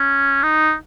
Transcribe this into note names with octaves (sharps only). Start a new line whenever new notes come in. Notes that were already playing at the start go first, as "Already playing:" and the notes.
Already playing: C#4
D#4